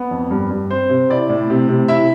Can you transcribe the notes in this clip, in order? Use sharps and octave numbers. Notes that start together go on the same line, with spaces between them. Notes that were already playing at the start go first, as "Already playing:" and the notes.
Already playing: B3
F2
G2
G2
C4 C5
C3
E4 D5
A2
C3
C3
E4 E5